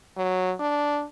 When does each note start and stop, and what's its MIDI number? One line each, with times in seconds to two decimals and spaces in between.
0.17 0.53 54
0.60 1.05 62